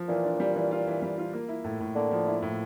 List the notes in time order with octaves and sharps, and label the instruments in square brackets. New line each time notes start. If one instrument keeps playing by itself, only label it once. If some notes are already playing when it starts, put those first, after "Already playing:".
Already playing: [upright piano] F3
[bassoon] A#2 [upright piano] E3
[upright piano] D4
G3
E3
F4
E3
G3
F4
A#3
E4
A2
A2
[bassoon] D3 [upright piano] A#3
[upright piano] F3
E4
A2